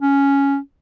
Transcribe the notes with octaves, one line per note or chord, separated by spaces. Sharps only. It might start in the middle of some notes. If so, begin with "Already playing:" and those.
C#4